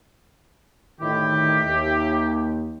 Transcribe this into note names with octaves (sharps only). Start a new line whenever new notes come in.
D2 A2 D#3 E4 G4
D#2